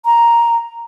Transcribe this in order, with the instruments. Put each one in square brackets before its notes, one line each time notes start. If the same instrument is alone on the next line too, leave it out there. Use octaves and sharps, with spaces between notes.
[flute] A#5